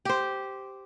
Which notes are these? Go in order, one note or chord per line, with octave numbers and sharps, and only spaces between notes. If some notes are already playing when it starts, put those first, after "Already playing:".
G4 C5